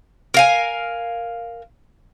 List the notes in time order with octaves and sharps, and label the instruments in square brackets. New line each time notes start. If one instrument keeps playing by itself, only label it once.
[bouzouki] A#4 F5 G#5